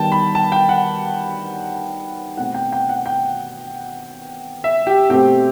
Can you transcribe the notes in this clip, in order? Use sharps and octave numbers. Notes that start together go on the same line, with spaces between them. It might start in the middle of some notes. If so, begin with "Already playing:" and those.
Already playing: D#3 G3 B3 G5 A5
B5
A5
G5
F#5
B2 A3 C4 F#5
G5
G5
F#5
G5
E5
G4
B2 A3 C4 G4